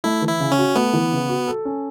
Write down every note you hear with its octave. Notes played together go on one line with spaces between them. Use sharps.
A3 E4
E3
E4
C#3
C#4
F#4
A3 B3
E3
C#3
F#4
A4
C#4